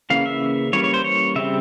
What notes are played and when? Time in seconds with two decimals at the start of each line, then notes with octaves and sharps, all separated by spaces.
0.10 C#3 E3 A#3 C#4 F5
0.26 E5
0.73 E3 G3 A#3 C#4 C#5
0.84 C#5
0.94 C5
1.04 C#5
1.36 C#3 G3 C4 E5